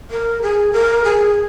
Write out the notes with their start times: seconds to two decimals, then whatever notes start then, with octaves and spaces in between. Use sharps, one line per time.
0.11 A#4
0.42 G#4
0.73 A#4
1.04 G#4